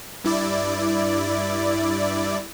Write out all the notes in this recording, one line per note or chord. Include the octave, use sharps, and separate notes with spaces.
G2 E4 D5